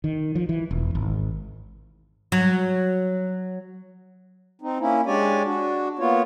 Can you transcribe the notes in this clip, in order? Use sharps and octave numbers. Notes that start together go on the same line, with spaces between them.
D#3
F3
E3
E1
G#1
F#3
C4 D#4
A#3 C#4 E4
G#3 D4 G4 C#5 D5 G#5
D4 F#4
A#3 B3 F4 C#5